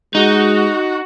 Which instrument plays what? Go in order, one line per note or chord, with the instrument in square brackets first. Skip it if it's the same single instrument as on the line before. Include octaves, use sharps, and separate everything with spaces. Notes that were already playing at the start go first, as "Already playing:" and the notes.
[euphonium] G#3 [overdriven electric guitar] D#4 [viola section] F#4